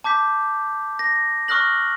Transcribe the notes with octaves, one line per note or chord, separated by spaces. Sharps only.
A5 D6 G6 B6
A#6
C#6 D#6 F6 F#6 A#6 F#7